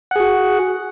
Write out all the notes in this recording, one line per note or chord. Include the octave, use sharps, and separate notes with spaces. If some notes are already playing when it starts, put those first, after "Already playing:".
F#4 G#4 F#5